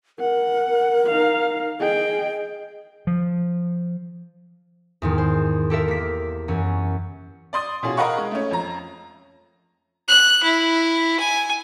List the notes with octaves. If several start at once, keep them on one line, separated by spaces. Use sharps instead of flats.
A#4 F#5
D#4 F5
G#4 D#5 G5
F3
E2 G#2 D#3
C5
G4 A4 A#4 E5
A#3 B6
F#2 E3 C#4
D5 C6 D#6
B2 C#4 F4 G#4
A#4 D#5 F5 F#5 B5 C#6
G#3
A3 C#4
F2 A#5
F#6
E4
G#5